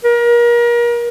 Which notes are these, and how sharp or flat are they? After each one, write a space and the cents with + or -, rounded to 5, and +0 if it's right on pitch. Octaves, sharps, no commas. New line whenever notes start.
A#4 +35